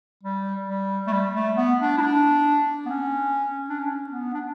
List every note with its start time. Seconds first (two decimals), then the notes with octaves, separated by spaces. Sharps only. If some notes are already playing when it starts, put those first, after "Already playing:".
0.23 G3
0.69 G3
1.07 A3
1.13 G3
1.35 A3
1.57 B3
1.80 D4
1.97 E4
2.02 D4
2.86 B3
2.91 C#4
3.69 D4
3.79 C#4
4.09 B3
4.34 D4